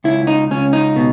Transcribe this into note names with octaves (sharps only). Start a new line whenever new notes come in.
C#2 E4
D#4
C#2 C#4
D#4
B2